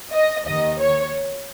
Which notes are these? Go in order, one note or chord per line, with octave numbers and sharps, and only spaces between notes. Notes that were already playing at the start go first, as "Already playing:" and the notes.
D#5
D#2 D#3 D#5
C#5